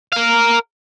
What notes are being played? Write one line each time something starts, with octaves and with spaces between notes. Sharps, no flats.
A#4 F5